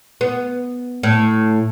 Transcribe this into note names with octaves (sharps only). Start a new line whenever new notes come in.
B3
A2